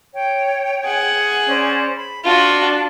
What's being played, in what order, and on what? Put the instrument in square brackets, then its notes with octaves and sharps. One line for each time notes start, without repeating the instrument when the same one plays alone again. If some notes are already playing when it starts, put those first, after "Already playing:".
[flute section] C#5 G5
[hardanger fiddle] G#4 F#5
[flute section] C#4 C5 D5
B5
[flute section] D4 D5 A5 [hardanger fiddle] F4 F#4